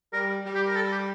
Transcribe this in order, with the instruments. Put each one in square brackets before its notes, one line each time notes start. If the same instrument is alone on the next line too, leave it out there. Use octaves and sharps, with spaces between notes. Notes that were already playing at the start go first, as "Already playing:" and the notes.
[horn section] G3 [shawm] A#4
[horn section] G3
[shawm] G4
A#4
A4
G4